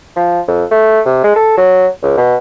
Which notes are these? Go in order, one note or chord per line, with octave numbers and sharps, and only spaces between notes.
F3
F2
A3
C3
G#3
A4
F#3
C#2
B2